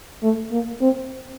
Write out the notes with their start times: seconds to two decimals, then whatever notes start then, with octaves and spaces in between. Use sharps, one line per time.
0.23 A3
0.52 A#3
0.81 C4